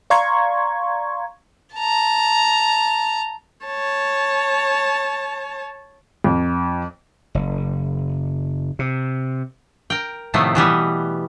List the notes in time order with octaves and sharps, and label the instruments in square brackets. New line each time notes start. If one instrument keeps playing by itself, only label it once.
[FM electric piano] D5 F5 A#5 C6 C#6 G#6
[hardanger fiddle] A5 A#5
[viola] C#5 A5
[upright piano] F2
[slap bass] F#1
C3
[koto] A#4 G5
A2 C3 D#3 F3 A3 B3
B2 E3 G3 B3